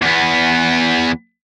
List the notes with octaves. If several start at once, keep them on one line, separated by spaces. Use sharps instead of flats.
E2 B3